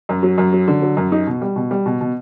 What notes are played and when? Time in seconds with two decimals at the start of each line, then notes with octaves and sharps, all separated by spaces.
0.09 F#2
0.23 F#3
0.38 F#2
0.53 F#3
0.68 D3
0.82 F#3
0.97 F#2
1.12 D#4
1.27 B2
1.41 G3
1.56 B2
1.71 G3
1.86 B2
2.01 B2